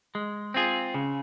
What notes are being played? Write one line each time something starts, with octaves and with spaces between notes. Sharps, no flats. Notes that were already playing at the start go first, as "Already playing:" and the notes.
G#3
C4 F4 G#4
C#3